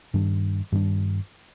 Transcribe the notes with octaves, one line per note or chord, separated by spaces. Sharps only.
G2 D#3 G3 D4
G2 D#3 G3 D4